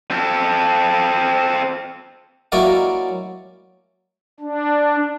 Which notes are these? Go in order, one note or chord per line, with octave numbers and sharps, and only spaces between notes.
C4 A4
F#3 A#3 C#4 E4 D5 D#5
D4